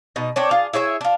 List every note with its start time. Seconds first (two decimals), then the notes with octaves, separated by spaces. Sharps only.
0.16 B2 D#4
0.36 C4 D4 C#5
0.51 F4 G#4
0.73 E4 G#4 C#5 E5
1.01 D4 F4